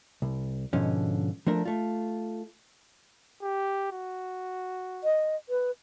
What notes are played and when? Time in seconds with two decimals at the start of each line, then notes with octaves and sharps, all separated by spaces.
0.22 C2
0.73 G#2 B2 D3 F3 C#4
1.47 F3 A3 D4 A#4
1.65 A3 F4
3.43 G4
3.92 F#4
5.04 D#5
5.49 B4